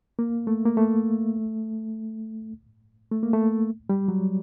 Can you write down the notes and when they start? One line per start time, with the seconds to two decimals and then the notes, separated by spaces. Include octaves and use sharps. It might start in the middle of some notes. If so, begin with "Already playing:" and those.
0.19 A#3
0.47 A3
0.65 A#3
0.77 A3
3.11 A3
3.23 A#3
3.33 A3
3.89 G3
4.08 F#3